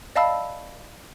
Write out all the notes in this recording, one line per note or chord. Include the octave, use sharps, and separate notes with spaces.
D5 D#5 F5 A5 B5 E6